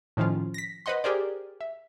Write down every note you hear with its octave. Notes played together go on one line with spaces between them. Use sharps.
A2 D#3 F3 C#4 F4
A#6 B6
B4 C5 D#5 F#5 C6
G4 G#4 A#4 C5 D5
E5